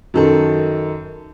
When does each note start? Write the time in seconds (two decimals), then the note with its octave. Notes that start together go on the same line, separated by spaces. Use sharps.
0.14 F#2 D#3 A4